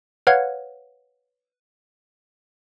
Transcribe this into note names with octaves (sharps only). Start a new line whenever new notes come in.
B4 C#5 F5 F#5 F6 G#6